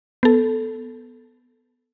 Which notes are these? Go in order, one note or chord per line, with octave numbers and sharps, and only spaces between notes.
B3 A4